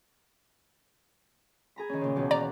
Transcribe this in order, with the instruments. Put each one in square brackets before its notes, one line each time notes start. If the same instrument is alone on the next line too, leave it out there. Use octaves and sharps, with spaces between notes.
[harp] G#4 A#5 B5
D#3 C#4
A#2 C#3
D#2 B2 E3
[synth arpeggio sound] D5 A#5